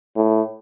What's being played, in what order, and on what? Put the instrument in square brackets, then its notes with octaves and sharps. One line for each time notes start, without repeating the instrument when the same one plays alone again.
[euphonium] A2